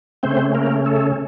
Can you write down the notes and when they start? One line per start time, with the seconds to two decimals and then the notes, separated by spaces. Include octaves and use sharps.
0.23 C#3 A3 C4 C#4 C5
0.54 A#3 A#4
0.85 A3 A4